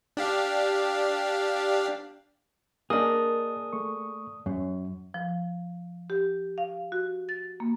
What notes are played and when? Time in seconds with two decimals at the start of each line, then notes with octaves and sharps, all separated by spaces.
0.17 D4 G4 F5
2.90 A#3 D4 G#4 A#4 D#5 D#6
3.73 A3 C#6
4.46 F#2 C#4
5.14 F3
6.10 G4
6.58 F5
6.92 F#4
7.29 A6
7.60 A#3